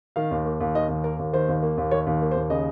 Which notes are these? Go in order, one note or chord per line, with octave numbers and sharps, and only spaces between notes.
D#3 F5
D#2
A#3
D#2
D#3 D#5
D#2
A#3 A#4
D#2
D#3 C5
D#2
A#3
D#2
D#3 C#5
D#2
A#3
C5
D#2
C#3 D#5